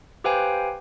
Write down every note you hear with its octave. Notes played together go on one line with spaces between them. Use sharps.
G4 B4 C5 F5 G5 G#5